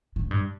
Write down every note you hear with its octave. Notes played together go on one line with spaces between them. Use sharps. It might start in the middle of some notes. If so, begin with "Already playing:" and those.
A2
G2